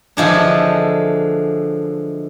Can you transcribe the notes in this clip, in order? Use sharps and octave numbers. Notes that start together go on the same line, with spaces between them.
D3 E3 F3 G#3 D4